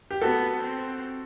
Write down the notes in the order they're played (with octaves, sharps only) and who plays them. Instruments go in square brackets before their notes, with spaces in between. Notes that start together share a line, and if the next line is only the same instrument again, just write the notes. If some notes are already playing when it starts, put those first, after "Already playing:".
[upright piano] G4
[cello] B3 [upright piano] F#4 A4
[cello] C4